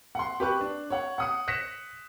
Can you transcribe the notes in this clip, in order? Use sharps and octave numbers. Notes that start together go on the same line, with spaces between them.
F#5 C6
G4 B4 C#6 F#6
D4
C#5 F#5
F#5 D#6 C#7
F#6 A#6 B6 C#7 E7